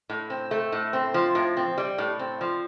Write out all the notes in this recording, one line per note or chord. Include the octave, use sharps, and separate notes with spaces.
A2
C4
A3
A2
C4
F3
A2
C4
G3
A2
C4
F3